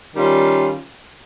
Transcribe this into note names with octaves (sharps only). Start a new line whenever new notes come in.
D#3 G3 C#4 F4